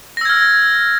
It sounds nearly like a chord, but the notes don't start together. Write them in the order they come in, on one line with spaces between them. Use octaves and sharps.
A#6 E6 G#6 F6